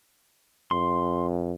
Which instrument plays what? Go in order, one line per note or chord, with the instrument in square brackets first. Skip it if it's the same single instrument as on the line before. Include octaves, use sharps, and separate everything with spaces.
[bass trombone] F2 [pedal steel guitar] C6